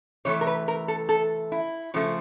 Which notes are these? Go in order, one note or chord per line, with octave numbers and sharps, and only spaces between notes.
C3 E3 A3 C#5
A#4
B4
A#4
A4
A4
E4
C#3 F3 A3